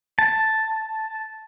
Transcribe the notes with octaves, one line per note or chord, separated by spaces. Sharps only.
A5